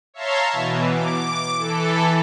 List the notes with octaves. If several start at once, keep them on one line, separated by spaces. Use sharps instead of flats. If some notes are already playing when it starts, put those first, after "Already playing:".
C#5 E5 F5 A5 A#5 C6
B2 E3
D6
E3 A4